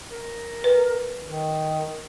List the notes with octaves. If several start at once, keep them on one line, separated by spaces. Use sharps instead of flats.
A#4
B4
D#3